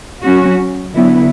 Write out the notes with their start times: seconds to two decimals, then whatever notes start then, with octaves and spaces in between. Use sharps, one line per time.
0.21 F#3 C#4 F#4
0.93 D3 F#3 B3 E4